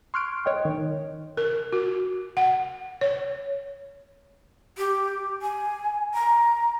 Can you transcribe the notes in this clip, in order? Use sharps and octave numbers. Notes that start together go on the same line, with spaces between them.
C6 C#6 F6 F#6 G#6 D7
C#5 D#5 G5
D#3
A#4
F#4
F#5
C#5
G4
G#5
A#5